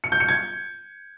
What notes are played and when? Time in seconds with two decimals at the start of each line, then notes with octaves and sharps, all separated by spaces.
0.04 C#7
0.12 G6
0.20 C#7
0.29 G#6